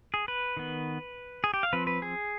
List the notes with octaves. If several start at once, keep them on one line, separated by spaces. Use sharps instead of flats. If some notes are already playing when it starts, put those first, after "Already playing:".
G#4
B4
D#3 B3
G#4
G4
F5
F3 C4 B4
B4
G#4